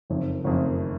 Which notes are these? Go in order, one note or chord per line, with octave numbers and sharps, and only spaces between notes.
F#1 F2 D#3
F#1 F2 D#3